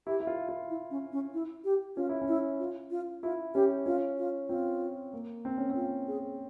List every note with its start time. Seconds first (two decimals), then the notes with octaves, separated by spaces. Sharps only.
0.07 E4 G4
0.20 E4
0.27 F4
0.49 F4
0.70 E4
0.91 C#4
1.12 C#4
1.34 E4
1.64 G4
1.96 C#4 F4
2.09 E4
2.22 C#4
2.28 E4
2.60 F4
2.91 F4
3.23 E4 F4
3.54 C#4 G4
3.86 C#4 F4
4.18 F4
4.49 C4 F4
5.13 A#3
5.45 C4
5.57 C#4
5.70 C4
5.76 F4
6.08 G#4